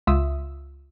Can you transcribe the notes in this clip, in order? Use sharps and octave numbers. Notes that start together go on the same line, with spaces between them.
C#2 F4 E5 D#6 E6